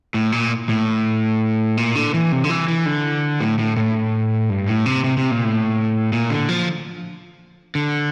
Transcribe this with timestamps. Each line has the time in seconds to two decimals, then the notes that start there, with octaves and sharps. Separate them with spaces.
0.14 A2
0.32 A#2
0.69 A2
1.77 A#2
1.95 D3
2.14 E3
2.32 C3
2.44 D3
2.50 E3
2.68 E3
2.86 D3
3.41 A2
3.59 A2
3.77 A2
4.50 G2
4.68 A2
4.86 C3
5.04 C3
5.18 C3
5.31 A#2
5.44 A2
6.13 A#2
6.30 D3
6.49 F3
7.75 D3